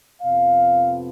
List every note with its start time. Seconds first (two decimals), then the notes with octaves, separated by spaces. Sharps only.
0.21 F2 C3 F3 B3 F5